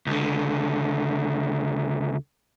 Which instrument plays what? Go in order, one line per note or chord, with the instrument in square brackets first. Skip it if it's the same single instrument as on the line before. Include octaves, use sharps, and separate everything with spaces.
[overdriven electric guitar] C#2 D3